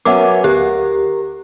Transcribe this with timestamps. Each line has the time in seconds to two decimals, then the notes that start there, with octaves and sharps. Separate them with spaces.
0.05 F#3 B3 C#4 A#4 E5 F#5 D6
0.44 D2 G4 A#4